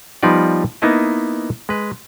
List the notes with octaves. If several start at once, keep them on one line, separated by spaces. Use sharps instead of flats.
F3 G3 B3 D#4 F4 D5
A#3 B3 D#4 E4 D#5
G#3 B4